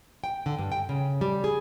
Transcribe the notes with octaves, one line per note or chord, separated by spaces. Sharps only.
G5
D3
G2
G5
C#3
G3
G#4